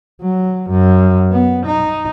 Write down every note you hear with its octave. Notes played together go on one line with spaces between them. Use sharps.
F#3
F#2
B3
D#4